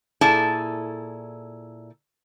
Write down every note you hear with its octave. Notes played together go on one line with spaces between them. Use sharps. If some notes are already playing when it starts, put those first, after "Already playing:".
A#2 E4 G#4 A4 D5 A5